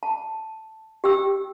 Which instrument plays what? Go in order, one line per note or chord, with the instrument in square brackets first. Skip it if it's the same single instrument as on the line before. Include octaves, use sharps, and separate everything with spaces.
[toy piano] A5
G4 G5 E6